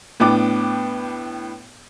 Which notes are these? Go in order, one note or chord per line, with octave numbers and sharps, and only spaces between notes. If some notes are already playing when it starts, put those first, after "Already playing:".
A2 B3 D4 B4 G5 D6